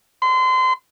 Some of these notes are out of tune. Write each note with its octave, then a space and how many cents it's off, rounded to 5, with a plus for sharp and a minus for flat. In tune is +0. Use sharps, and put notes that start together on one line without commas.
C6 -30